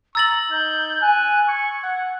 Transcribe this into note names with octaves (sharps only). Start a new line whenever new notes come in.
A#5 C#6 E6 A6 F#7
D#4 G6
G#5 F#6
C#6 G#6
F#5